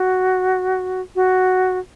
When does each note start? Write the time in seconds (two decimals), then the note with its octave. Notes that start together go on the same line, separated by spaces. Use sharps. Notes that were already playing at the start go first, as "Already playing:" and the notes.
Already playing: F#4
1.15 F#4